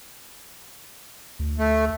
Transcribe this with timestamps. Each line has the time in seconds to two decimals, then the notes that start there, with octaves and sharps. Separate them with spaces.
1.39 D2
1.58 A3